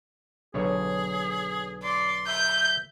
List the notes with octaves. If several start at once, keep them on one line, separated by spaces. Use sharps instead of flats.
B1 D3 G#4 C#5
D5 C6
E5 G6